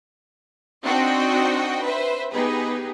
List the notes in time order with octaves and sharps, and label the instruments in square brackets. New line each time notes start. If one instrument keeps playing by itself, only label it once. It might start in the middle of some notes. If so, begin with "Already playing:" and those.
[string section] C4 D4 D#4 F#4 D#5 G5
B4 C5 E5
B3 D#4 G4 G#4 B4